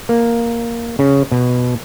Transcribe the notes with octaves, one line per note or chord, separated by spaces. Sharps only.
A#3
C#3
B2